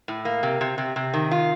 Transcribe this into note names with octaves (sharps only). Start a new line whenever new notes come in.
A2
A#3
C3
C3
C3
C3
D#3
F4